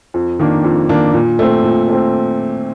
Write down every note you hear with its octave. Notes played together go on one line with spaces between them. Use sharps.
F2
D#3 A#3 D4
F2
D#3 A#3 D4
A#2
A3 C4
A#2
A3 C4